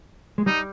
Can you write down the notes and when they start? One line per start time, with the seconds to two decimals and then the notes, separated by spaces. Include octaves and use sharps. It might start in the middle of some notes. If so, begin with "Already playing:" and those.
0.38 G#3
0.46 G3 D#4